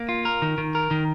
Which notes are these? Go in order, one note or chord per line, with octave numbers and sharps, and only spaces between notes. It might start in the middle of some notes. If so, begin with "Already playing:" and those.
Already playing: A#3
F4
A#4
D#3
D#3
A#4
D#3